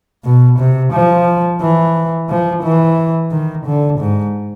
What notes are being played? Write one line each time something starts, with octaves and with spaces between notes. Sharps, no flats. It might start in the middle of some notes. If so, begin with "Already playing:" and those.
B2
C3
F3
E3
F3
E3
D#3
D3
G#2